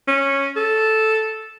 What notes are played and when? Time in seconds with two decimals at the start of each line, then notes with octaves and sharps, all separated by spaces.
0.08 C#4
0.56 A4